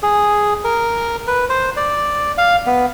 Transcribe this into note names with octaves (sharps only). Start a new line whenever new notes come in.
G#4
A#4
B4
C5
D5
F5
B3